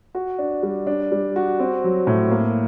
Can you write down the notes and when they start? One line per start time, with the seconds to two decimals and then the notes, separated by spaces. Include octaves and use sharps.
0.15 F#4
0.38 D4
0.63 G3
0.87 D4
1.12 G3
1.36 F#4
1.59 C4
1.84 F#3
2.07 A2
2.31 A#3